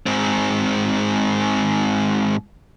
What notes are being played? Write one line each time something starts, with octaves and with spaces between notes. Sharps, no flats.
G#2 C4